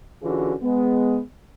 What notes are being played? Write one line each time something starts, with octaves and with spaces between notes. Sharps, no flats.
D3 E3 C#4 F4 F#4 G#4
G#3 B3